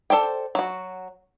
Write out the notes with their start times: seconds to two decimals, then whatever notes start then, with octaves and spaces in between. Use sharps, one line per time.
0.10 A4 C5 D5 G5
0.55 F#3 F#4